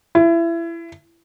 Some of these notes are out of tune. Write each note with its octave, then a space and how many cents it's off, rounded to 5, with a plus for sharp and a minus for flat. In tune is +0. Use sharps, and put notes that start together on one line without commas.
E4 +25